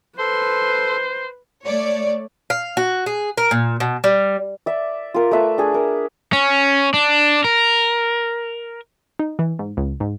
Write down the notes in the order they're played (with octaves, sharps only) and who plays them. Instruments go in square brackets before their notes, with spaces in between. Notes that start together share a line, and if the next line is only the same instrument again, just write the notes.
[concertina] A4 C6 [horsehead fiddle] B4 [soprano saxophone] C5
[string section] A3 C#5 D5
[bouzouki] F5
F#4
G#4
A#4
A#2
B2
G3
[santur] D5 E5
F4 A#4
A3 B4 E5 D6
D4 G#4
A#4
[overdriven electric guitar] C#4
D4
A#4
[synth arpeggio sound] D#4
E3
G#2
C#2
G#2